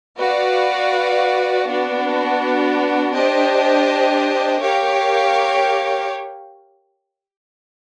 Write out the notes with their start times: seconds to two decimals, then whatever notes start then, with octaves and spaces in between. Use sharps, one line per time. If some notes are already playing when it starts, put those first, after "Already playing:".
0.17 F#4 B4 D5 F5
1.66 B3 D4 F#4
3.12 D4 G4 C5 D#5
4.60 G4 A#4 C#5 F5